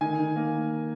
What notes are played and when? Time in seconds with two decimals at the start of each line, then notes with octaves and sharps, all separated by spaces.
0.01 D#3 G#5
0.19 D#3
0.36 A#3